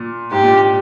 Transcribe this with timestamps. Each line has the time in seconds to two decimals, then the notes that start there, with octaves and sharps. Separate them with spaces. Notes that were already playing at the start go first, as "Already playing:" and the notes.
Already playing: A#2
0.31 G#2 G4
0.43 A#2